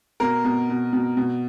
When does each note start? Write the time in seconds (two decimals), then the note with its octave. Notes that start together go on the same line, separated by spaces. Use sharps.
0.20 B2 A#4
0.44 B2
0.70 B2
0.93 B2
1.17 B2